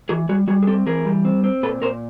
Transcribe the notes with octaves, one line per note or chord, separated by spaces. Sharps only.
E3 F#4 G#4
G3 F#4 G#4
G3 F#4 G#4
G#4
C4 G4 A4
E3 G#4 A#4
G3
C4
C4
A#2 A4 B4
A#2 A#4 C5